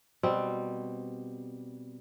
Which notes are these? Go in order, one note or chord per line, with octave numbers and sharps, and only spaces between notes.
B2 G3 C4